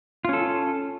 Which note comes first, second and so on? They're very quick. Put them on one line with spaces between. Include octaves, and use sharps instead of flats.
F4 C#4 A4